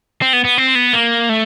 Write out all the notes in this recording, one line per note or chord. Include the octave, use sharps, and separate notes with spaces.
C4
B3
B3
C4
B3
A#3
A3